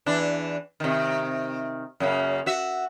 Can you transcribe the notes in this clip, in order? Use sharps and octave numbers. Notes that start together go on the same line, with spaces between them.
E2 E3 D4
C3 D#3
F#2 C#3 A#3
F#4 E5